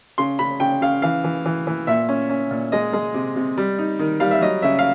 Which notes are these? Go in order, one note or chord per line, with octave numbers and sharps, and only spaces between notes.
C#3 C6
C#3 B5
C#3 G5
C#3 F5
E3 F5
E3
E3
E3
A#2 E5
C#4
C#4
A#2
G#3 D#5
G#3
C3
C3
G3
D#4
D#3
G3 F5
E5
F#3 D#5
C#3 E5
F5